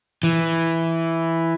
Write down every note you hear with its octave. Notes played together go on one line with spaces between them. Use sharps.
E3